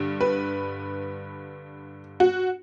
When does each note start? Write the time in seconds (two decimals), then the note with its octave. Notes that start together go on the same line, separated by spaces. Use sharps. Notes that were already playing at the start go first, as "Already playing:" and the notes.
Already playing: G2 D3
0.21 B4
2.20 F#4